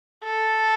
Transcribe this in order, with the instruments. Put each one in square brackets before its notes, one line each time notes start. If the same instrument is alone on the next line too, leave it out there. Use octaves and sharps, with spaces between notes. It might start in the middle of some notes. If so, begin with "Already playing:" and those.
[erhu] A4